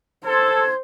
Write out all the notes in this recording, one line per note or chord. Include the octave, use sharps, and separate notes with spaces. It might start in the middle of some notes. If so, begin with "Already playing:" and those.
A4 C5 C6 G#6